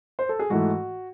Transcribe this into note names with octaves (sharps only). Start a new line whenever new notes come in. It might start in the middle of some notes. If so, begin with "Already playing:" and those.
C5
A4
G#4
G#2 E3 A3 F#4